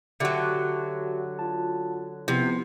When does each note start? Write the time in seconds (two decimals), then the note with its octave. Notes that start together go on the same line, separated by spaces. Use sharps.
0.20 D3 F#3 F#4 G4 E5
1.39 F4 A5
2.28 C3 F3 B3 E4